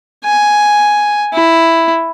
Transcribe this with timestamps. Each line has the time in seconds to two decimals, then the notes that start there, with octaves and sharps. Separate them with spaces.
0.25 G#5
1.33 E4